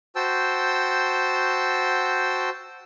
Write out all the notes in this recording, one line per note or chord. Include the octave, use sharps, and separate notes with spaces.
F#4 C5 G5 A5 E6